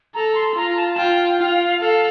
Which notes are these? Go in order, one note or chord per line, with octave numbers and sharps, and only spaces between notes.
A4 A#5
C6
C6
F4 A#5
A5
F4 G5
G5
F4 F5
A4 F5